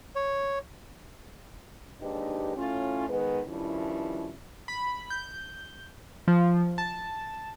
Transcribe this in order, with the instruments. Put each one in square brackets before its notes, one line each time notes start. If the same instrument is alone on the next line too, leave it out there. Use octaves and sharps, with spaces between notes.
[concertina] C#5
[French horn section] D#2 G#2 D4 D#4 G4 B4
A2 C#4 F4
D#3 G#3 B3 B4
G2 D#3 F3 C#4 E4
[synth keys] B5
G6
F3
A5